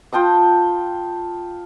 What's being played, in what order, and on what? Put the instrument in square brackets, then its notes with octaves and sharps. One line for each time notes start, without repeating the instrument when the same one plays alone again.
[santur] F4 G5 A5 D#6